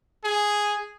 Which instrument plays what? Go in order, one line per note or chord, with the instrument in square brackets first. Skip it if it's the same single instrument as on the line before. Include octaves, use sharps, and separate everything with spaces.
[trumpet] G#4